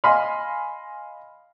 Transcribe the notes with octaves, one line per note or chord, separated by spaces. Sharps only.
D#5 F5 G#5 B5 C6 F6